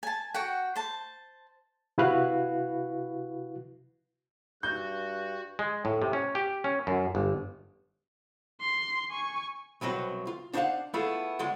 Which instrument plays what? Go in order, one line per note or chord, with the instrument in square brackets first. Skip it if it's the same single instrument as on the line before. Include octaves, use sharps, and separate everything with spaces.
[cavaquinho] G#5 A5
F#4 F#5 G5
C5 A5
[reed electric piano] C3 E4 F#4 B4 F5 F#6
[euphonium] G2 [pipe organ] F#4 [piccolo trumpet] F#6 [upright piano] G6
[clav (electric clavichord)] G#3
A2
C3
C#4
G4
C#4
F#2
G1
[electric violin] C6
G#5 C#6
[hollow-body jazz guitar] C2 B2 F#3 C4 B4
F4
D4 D#4 C5 C#5 F5 F#5
A3 B3 E4 F4 G#4 A4
C#2 G#3 D5 F#5 C6